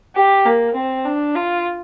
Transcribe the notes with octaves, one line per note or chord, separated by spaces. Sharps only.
G4
A#3
C4
D4
F4